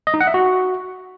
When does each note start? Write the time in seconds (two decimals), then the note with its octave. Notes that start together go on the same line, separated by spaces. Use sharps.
0.07 D#5
0.14 D#4
0.21 F#5
0.27 E5
0.34 F#4